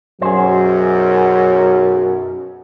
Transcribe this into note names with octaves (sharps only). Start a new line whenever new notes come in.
B1 F#2 F#3 G#4 C5